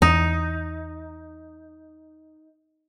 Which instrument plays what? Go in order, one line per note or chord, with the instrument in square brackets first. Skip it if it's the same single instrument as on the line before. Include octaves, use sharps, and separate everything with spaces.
[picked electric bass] E2 [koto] D#4